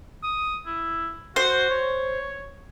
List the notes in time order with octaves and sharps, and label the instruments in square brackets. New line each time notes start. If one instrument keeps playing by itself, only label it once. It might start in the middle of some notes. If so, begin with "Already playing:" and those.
[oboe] D#6
E4
[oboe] F#4 [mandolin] C5
[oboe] C#5